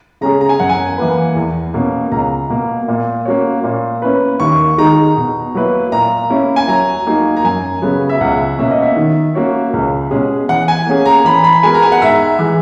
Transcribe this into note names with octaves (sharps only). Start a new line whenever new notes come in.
C#3 G#3 C#4 G#4 A#5
A#5
G#5
F#2 F#5
G#5
E3 A#3 E4 B4
E2
B2 A#3 C#4
C#2 A#5
B2 A#3
A#2
A#3 C#4 F#4 C#5
A#2
A#3 C#4 E4 B4
D#2 C#6
D#3 G#3 D#4 G#4 A#5
B2
F#3 A#3 E4 B4
A#2 A#5
A#3 C#4 E4
G#5
F#3 A#5
A#3 D#4 F#4
A#5
F#2 G#5
C#3 F#3 B3
E5
C#2 F#5
B2 A#3 C#4 E5
D#5
E5
D#3
A#3 C#4 F#4 C#5
C#2
B2 G#3 C#4 G#4
E3 F#5
G#5
A#3 C#4 G#4
A#5
E3 B5
B5
G#3 B3 F#4 A#4 G#5
A#5
G#5
F#5
G#2 E5
E3 G#3